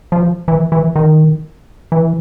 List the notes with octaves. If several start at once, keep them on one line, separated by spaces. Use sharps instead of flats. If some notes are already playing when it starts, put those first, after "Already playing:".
F3
E3
E3
D#3
E3